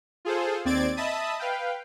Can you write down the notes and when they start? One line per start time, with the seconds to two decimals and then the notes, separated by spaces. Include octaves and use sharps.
0.25 F4 G#4 A4 C5
0.65 D#2 C4 D5 G#6 A6 D7
0.97 D#5 E5 A5 B5 D#6
1.39 B4 F5 G5